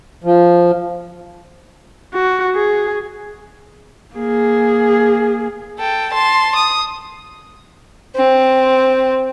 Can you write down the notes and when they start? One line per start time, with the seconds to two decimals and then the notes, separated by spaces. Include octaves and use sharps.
0.24 F3
2.14 F#4
2.56 G#4
4.15 A#3 G#4
5.79 A4 G5
6.13 A5 C6
6.56 D#6
8.16 C4